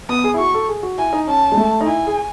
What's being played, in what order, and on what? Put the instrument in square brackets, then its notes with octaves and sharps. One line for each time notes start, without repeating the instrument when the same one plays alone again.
[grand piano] B3 [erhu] D#6
[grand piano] G#4
E4
[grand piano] F#4 [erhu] C#6
[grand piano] A4
G#4
F#4
[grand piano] E4 [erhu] G#5
[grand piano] D#4
[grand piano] C#4 [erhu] A5
[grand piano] G#3
A3
D#4
[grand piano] E4 [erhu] G#5
[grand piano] G#4